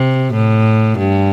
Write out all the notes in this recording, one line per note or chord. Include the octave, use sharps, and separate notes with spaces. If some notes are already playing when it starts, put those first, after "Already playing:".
Already playing: C3
A2
G2